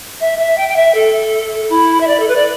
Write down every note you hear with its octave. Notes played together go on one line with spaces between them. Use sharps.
E5
E5
G5
G5
E5
A4
E4
E5
D5
A4
B4
D5